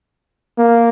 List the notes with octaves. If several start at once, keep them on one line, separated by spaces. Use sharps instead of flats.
A#3